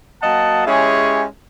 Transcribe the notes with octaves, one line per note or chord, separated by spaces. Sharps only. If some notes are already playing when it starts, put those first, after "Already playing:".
F#3 A#3 D#5 F#5 A5
G#3 C#4 E4 G4 G#4 C#5